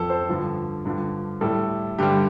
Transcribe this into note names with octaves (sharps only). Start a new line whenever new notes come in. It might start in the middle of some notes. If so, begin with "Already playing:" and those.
Already playing: F2 F3 A4
C5
G2 D3 F3
G2 D3 F3
A2 G3 A4
G2 D3 G3 G4